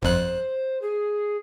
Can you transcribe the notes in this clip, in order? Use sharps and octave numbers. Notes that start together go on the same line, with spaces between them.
G1 F2 C5 F#6
G#4